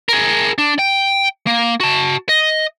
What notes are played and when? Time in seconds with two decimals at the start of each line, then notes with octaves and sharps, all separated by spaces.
0.09 G#4 A#4
0.58 D4
0.79 G5
1.47 A#3
1.80 F#4 A5
2.29 D#5